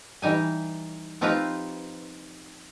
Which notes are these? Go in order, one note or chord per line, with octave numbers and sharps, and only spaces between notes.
E3 G3 D#4 G#5
F3 C4 D#4 F4 G4 B4